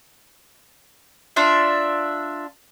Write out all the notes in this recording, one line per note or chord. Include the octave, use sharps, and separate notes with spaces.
D4 F4 E5